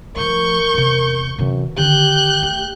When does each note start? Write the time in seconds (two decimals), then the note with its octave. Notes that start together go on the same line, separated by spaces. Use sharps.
0.16 F3 A3 A#4 C#6 G6
0.74 E2 C3
1.39 F#2 C3 E3
1.78 D3 D#3 G4 F#6 G6
2.43 A3